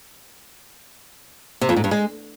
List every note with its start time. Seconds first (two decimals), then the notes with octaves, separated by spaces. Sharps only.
1.61 C3
1.69 F2
1.76 G#2
1.84 G2
1.91 G#3